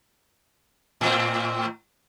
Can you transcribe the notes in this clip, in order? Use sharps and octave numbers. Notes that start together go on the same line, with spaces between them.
A2 C4